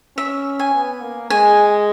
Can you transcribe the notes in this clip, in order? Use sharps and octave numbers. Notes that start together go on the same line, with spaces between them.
C#4 E5
G#5
B3
A#3
G#3 G#5